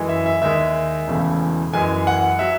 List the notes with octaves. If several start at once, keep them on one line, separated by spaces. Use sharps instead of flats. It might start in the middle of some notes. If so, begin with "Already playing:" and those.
Already playing: F#2 E3 G#3
E5
E5
D#2 D#3 G#3 E5
E1 E2 C#3 E3 A3
F#2 E3 G#3 G#5
F#5
F#3 E5